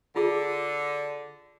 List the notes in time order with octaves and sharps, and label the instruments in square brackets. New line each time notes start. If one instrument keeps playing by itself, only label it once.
[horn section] D3 [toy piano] F4 G#4